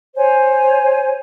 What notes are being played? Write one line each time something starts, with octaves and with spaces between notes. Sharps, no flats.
C5 C#5 G#5